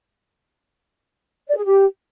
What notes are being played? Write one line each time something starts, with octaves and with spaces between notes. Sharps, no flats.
D5
G#4
G4